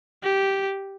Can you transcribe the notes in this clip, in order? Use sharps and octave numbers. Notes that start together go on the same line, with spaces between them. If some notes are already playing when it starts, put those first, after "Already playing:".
G4